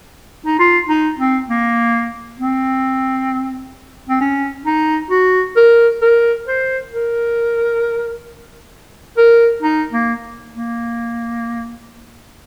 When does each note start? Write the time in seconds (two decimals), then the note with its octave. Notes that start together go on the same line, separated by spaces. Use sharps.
0.46 D#4
0.59 F4
0.89 D#4
1.18 C4
1.49 A#3
2.39 C4
4.09 C4
4.21 C#4
4.66 D#4
5.10 F#4
5.56 A#4
6.02 A#4
6.46 C5
6.92 A#4
9.17 A#4
9.62 D#4
9.93 A#3
10.53 A#3